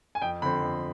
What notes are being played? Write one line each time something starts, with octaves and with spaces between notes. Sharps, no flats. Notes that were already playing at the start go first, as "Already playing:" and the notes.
G#5
F2 G5
D3 F3 C4 B5
F2